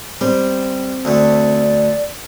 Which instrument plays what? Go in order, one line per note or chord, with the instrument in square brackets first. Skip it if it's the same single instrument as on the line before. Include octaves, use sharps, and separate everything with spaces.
[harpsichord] G3 [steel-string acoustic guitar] C4
[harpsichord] D2 A3 [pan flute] D5